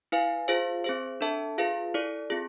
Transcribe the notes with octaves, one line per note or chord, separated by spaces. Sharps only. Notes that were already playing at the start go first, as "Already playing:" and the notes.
E4 B4 F5 G#5
F4 G#4 C5 F5
C4 G#4 C5
D4 A4 E5 A5
F4 G#4 B4 F5
E4 A4 D5
C4 F4 G#4